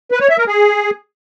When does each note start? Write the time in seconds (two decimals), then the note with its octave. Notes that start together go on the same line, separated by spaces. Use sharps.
0.11 B4
0.20 C#5
0.29 E5
0.38 A#4
0.47 G#4